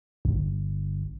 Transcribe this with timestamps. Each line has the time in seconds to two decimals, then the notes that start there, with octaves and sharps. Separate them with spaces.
0.25 G1